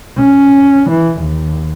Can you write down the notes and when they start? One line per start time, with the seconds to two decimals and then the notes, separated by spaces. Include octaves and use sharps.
0.18 C#4
0.90 E3
1.20 D#2